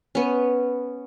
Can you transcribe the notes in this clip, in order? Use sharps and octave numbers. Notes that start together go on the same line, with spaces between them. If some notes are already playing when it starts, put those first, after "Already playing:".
B3 C#4